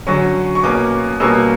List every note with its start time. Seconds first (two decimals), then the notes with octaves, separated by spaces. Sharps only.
0.07 D3 F#3 C#4 C#6
0.55 C#6
0.63 B2 A#3 C#4 D6
1.20 B2 G3 A#3 C#4 E6